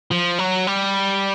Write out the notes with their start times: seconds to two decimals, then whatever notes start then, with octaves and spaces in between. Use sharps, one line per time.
0.11 F3
0.39 F#3
0.67 G3